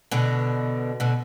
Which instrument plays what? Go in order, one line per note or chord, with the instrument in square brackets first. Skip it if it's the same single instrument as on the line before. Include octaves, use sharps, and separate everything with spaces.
[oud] B2 D3
B2 D3